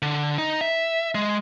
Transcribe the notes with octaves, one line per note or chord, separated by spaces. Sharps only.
D3
D#4
E5
G#3